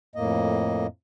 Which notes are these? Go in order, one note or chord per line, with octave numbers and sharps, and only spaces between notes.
F2 A2 A#3 D#5